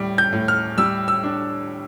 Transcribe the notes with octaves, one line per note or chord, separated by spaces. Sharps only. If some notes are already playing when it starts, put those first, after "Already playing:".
Already playing: A2 G3
G6
A2
F6
G3 E6
E6
D4